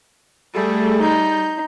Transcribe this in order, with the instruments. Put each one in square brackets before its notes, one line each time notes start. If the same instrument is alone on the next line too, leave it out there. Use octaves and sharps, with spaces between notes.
[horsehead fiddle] G3 [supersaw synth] A3 G#4 A4
[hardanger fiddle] D#4 [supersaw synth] G6